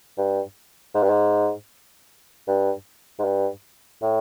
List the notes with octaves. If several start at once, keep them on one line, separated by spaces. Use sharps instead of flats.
G2
G#2
G2
G#2
G2
G#2
G2
A2